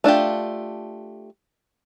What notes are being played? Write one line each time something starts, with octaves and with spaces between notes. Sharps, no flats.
A3 D4 F4 G4